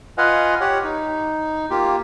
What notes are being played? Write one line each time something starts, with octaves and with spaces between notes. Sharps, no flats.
F4 B4 D#5 F5 F#5 G#5
G4 C#5 F#5
D#4
A#3 F4 G4